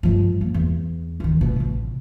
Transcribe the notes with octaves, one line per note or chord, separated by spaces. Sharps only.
G2 F3
A#3
E2
E2 D#3
B2
A1 C3